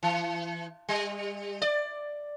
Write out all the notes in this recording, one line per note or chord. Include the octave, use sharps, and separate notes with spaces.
E3
G3
D5